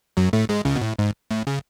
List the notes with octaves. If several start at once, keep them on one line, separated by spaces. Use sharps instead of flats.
F#2 F#3
A2 A3
G#2 G#3
C#2 C#3
B2
A2
G#2
A2
C#3